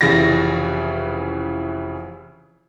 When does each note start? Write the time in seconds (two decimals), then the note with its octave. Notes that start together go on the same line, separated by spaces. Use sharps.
0.01 F1 C#3 E3 A6 A#6